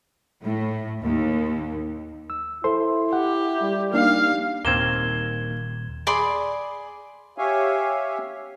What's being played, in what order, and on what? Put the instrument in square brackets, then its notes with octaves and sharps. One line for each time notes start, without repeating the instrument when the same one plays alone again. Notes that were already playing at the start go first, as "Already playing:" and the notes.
[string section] A2
D#2
[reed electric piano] E6
[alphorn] E4 [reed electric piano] A4 C5 C6
[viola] G4 [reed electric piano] F#5
[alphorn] G3
[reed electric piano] A#3 D4 D#4 [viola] F5
[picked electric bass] D#1 [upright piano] D#2 [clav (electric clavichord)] A#3 C4 [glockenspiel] G#6 E7 G7
[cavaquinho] G#4 D5 B5 C6
[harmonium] G4 C#5 E5 F5 G#5